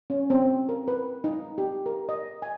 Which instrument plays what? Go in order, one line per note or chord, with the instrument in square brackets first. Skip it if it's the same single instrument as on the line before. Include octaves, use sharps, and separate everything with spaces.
[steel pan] C#4
C4
A#4
B4
D#4
G4
A#4
D#5
G#5